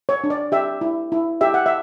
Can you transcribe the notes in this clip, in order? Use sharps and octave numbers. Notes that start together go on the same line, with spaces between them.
C#5
D4
D5
G4 E5
E4
E4
G4 E5
F#5
E5